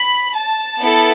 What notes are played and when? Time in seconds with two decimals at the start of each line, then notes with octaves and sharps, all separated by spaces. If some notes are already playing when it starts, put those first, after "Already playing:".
Already playing: B5
0.34 A5
0.78 B3 E4 A4